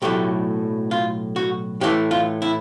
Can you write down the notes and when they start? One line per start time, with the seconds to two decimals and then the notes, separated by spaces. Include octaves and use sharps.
0.02 B1 A2 F#3 A3 G4
0.91 F4
1.36 F#4
1.81 A2 E3 A3 G4
2.11 F4
2.42 E4